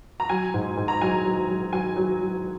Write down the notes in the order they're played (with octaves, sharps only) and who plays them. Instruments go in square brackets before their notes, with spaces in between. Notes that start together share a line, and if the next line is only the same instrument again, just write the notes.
[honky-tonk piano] A#5
F#3 G#5
G#2
G#2
A#5
F#3 G#5
F#3
F#3
F#3 G#5
F#3
F#3